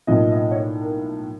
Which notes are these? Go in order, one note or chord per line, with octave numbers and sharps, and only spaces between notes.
B1 A2 F3 A#3 D#5
D#5
C#5
D5
A#4